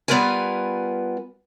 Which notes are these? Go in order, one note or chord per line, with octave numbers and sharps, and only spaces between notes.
G3 B3 F4 A#4 B4 G#5